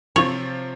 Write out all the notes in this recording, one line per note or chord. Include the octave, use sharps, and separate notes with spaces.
C3 F3 C4 C#5